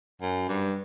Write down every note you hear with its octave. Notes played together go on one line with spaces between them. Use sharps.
F#2
G2